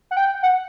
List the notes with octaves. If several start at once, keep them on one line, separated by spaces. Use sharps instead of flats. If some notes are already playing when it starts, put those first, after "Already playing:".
F#5
G5
F#5